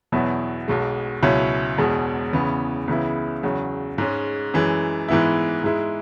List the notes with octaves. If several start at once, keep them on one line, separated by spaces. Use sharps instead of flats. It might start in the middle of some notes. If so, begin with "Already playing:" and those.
E2 B2 F#3 B3 E4
B1 B2 G#3
C#2 B2 F#3 C#4 E4
E1 E2 B2 G#3
E2 C#3 E3 B3
C#2 C#3 E3 B3 E4
E2 C#3 F#3
G#2 G#3 C#4
F#2 E3 G#3
G#2 E3 B3 E4
G#2 G#3 E4